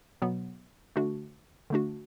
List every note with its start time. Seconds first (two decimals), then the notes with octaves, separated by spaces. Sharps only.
0.22 B2 F#3 B3
0.96 D3 A3 D4 F#4
1.70 D3 A3 D4 F#4